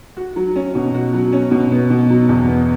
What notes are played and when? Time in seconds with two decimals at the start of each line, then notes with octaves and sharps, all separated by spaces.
0.17 F#4
0.36 F#3
0.56 C#4
0.75 B2
0.94 F#4
1.14 F#3
1.33 C#4
1.51 B2
1.72 B3
1.90 B2
2.10 F#3
2.29 E2
2.48 B3